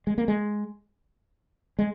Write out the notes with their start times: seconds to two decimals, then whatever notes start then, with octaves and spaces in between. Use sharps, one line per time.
0.07 G#3
0.18 A#3
0.28 G#3
1.79 G#3